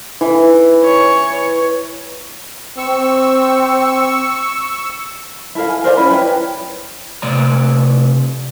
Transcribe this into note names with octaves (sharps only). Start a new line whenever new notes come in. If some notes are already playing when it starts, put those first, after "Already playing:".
E3
C#5
C4 C#6 E6
E4 A4 A#4 F5
G#5
A#4 C5 D5 F5
C#4 E4 A#4 B5
B4 C#5 G5
C3 A3 D5 A#5